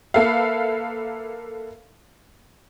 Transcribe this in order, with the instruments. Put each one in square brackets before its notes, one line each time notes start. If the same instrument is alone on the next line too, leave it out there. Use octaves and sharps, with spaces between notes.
[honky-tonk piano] A#3 A4 B4 E5 F5